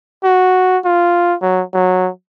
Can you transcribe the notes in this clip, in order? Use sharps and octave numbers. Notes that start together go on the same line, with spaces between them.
F#4
F4
F#3
F#3